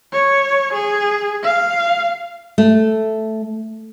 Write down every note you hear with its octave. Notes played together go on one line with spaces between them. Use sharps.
C#5
G#4
F5
A3